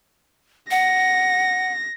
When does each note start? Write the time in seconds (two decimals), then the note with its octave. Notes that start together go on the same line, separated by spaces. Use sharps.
0.71 F#5 A#6